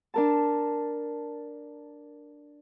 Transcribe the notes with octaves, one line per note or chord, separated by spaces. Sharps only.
D4 A#4 A5